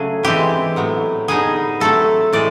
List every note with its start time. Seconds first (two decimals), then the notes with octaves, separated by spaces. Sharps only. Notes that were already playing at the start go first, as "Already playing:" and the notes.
Already playing: C#3 F#3 A3 D4 G#4
0.23 E3 G#3 C4 E4 G4
0.76 A2 F#3 B3
1.28 D3 G3 B3 D#4 G#4
1.80 F#3 A3 C4 E4 A4
2.33 A2 E3 G#3 D5